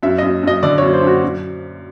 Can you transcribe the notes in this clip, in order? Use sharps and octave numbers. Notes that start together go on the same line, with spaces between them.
F#2 E5
F#2 D#5
F#2 D#5
D3 D5
F#2 C#5
C5
F#2 F#4
F#2